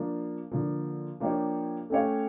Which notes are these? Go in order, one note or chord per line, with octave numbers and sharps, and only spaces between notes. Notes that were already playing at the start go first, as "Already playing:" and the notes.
Already playing: F3 A#3 D4
D3 F3 A#3
F3 A#3 D4 G4 C#5
A3 C#4 G4 C#5 F5